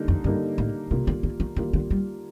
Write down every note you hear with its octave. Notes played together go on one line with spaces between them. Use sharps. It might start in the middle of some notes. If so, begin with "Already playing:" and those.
Already playing: D3 G3 A#3 D#4
F2
G2 D3 G3 A#3 D#4
A2
C3 G3 A#3 F4
D3
D3
D#3
D#3 G3 A#3 F4
D3
G3